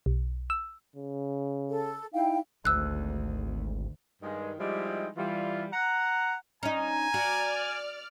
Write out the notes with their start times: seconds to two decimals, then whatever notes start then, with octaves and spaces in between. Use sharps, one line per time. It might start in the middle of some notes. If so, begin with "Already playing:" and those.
0.06 B1
0.50 E6
0.96 C#3
1.69 A4
2.14 D#4 E4 F5 G5
2.65 G#1 D2 E6 F#6
4.23 G2 D#3 G#3
4.58 F3 G3 G#3 D#4 E4 G4
5.17 E3 G3 F4
5.73 F#5 A#5
6.63 C#4 D#4 G#5 A#5
7.14 F#4 D5 F6